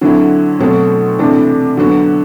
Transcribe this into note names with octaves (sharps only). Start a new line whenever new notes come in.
D3 F#3 C4 E4
B2 F#3 A3 C4 F#4
C3 E3 A3 D4
D3 F#3 B3 F#4